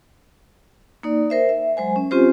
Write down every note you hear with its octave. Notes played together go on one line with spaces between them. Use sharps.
A#3 D#4 D5
A#4 C5 E5
E5
F#3 G#3 C5 G#5
C#4
C4 C#4 F4 G4 C5